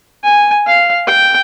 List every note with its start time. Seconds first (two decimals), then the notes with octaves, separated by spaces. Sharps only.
0.23 G#5
0.67 F5
1.07 G5